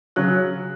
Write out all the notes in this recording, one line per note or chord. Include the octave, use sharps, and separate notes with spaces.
C#3 F#3 C#4 F#6